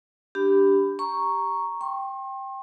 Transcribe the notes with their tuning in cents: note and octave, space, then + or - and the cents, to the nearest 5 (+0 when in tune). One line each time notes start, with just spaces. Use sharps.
D4 +0 G4 +0 B5 +15
A#5 +0 C#6 +0
G5 +0 C6 +45